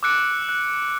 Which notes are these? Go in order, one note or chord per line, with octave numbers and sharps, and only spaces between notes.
D6 E6 F#6 C#7 D7
F#6